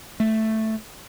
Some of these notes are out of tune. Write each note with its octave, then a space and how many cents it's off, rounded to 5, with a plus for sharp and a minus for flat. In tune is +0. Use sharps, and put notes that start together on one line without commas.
A3 +0